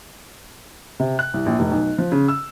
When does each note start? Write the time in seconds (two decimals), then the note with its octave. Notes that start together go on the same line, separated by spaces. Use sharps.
1.00 C3
1.19 F#6
1.34 C2
1.46 A#1
1.59 F1
1.71 B1
1.98 F3
2.12 C#3
2.28 E6